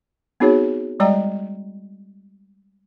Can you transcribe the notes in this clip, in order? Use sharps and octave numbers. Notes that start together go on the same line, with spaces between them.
B3 C4 D#4 F#4 G#4 C#5
G3 G#3 D5 D#5 G5 A#5